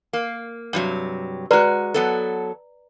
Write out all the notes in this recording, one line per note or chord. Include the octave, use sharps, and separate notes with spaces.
A#3
G2 C3 F#3
G#3 F#4 B4 D5 A#5
F#3 B3 A4